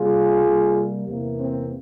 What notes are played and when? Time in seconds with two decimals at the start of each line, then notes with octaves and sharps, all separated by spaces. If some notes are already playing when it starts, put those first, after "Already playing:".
Already playing: C3 G3 A#3 F4 G#4
0.44 C3 G3 A#3
1.07 E2 C3 E3 A#3
1.39 C4